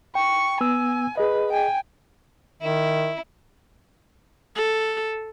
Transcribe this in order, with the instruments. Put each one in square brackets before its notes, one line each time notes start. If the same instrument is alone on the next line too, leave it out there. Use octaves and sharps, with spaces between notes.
[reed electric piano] G5 [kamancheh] C#6
[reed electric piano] B3 E6 [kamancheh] G#5
[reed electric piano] G#4 D#5 [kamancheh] B4
[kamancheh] G5 G#5
[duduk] D#3 [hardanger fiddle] E4
[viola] A4